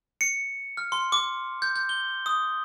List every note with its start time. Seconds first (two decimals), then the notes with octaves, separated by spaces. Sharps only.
0.21 C#7
0.77 F6
0.92 C6
1.12 D6
1.62 G6
1.76 G6
1.89 G7
2.26 D#6